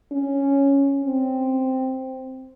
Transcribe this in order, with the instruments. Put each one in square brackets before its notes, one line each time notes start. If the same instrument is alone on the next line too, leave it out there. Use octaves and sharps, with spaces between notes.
[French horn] C#4
C4